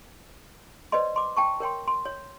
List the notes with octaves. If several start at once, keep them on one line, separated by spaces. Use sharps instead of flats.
B4 C5 D5 D#5 C6
C6 D6
G5 A5 C#6
A#4 C#5 G5 C6
C6
C#5